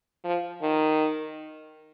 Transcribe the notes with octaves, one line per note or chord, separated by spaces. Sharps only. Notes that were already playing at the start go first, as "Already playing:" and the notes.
F3
D#3